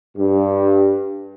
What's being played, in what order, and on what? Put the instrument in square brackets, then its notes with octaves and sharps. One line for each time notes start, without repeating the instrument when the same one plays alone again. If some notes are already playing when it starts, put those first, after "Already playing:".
[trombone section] G2